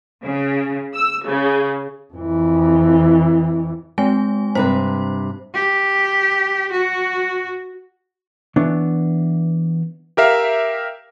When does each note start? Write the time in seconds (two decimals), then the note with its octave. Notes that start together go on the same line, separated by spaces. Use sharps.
0.24 C#3
0.94 E6
1.27 C#3
2.14 F2 E3
3.98 G#3 C4 G#5
4.55 G2 C3 B4 C5
5.55 G4
6.72 F#4
8.56 E3 B3 D4 C#5
10.17 G4 A#4 E5 F5